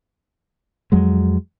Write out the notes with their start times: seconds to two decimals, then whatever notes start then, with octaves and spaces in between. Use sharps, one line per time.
0.92 F2 F#3 G#3